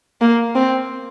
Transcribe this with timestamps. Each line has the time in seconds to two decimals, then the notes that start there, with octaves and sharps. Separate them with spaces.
0.21 A#3
0.55 C4